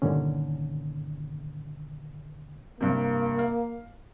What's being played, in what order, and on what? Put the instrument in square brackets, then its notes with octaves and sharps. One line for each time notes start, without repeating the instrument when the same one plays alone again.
[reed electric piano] G2 A#2 D3 D#3 C#4
[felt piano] G2 C3 [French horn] A#3
[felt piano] F5